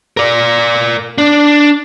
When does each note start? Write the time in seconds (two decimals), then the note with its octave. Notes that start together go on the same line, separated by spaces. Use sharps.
0.17 A#4 D5
1.18 D4